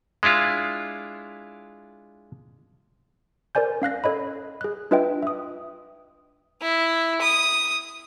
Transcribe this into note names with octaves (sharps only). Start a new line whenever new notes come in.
G#3 D4 E4 F4
A#4 C5 D5 G#5 G6
C#4 F5 F#6 A#6
A4 C#5 D#5 B5
G#4 F#6
D4 F4 B4 D#5 E5 G5
E5 D#6
E4
D#6